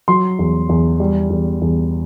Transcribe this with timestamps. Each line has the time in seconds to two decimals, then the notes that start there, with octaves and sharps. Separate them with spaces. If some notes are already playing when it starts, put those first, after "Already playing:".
0.08 F#3 C6
0.39 E2
0.69 E2
1.00 G3
1.30 E2
1.61 E2